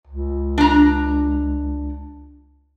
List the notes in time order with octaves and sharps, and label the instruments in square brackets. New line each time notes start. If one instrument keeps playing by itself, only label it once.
[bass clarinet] C#2
[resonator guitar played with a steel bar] D4 A#5